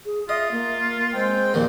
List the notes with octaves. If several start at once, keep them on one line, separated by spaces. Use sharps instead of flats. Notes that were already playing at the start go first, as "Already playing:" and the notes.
G#4
F4 D#5 E5
A#3
G#3 C4 G5
A#1 D#2 A#2 D#3